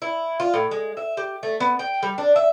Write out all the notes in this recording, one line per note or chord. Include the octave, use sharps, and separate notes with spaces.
E4
F4
A2
G#3
E5
G4
A3
B3
G5
G3
D4
E5